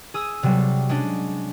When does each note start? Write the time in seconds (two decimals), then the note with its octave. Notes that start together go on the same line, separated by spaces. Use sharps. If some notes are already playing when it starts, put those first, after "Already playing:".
0.14 G#4 D#6 E6
0.43 C3 F#3 G3
0.89 G#3 C#4 D4